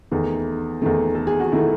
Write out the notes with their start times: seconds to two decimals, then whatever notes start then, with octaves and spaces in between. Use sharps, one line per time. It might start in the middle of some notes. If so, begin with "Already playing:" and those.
0.12 E2 D#3 A3
0.82 E2 D#3 A3
1.15 A4
1.27 G#4
1.40 F#4
1.52 D#3 A3 E4